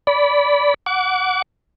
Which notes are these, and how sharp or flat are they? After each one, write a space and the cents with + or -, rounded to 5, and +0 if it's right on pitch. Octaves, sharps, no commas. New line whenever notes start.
D5 -25 B5 +0
F#5 +0 D6 -35